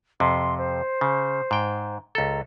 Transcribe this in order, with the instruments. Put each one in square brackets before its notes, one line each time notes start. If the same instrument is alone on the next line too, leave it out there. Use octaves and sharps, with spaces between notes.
[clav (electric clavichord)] F2 C3 [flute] C6
[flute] C5
[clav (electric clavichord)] C#3
G#2 G5
[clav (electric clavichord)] C#2 A4 [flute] A#5